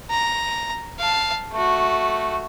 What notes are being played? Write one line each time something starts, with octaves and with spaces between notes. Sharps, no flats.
A#5
F5 A5
A3 F#4